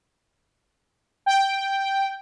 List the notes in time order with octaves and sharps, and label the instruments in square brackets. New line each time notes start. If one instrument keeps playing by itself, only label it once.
[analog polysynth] G5